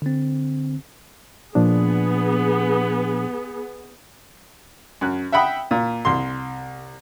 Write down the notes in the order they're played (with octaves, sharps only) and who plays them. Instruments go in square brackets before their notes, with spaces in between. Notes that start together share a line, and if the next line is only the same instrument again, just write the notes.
[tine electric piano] D3 C4
[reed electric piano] A#2 F3 D4 [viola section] B3 G#4
[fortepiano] F#2 F#6
E5 F#5 G5 B5 D#6
A#2
C2 C6